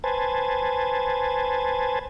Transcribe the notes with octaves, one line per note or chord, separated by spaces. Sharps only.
B4 C5 G#5 A5